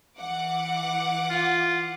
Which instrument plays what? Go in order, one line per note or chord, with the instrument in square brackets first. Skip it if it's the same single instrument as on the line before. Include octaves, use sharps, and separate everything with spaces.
[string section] E3 F#5 D6
[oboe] F4